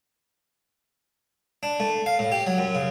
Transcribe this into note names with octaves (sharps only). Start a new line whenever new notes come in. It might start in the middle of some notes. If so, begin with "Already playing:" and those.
D4
A3
F5
A2
G4
F#3
F#2
C#3